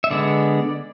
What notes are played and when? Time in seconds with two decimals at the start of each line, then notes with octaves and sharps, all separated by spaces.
0.04 E5
0.11 D3 G#3 B3 D5